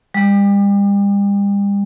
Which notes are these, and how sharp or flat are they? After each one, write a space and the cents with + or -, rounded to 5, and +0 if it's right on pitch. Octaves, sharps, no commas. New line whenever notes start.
G3 +40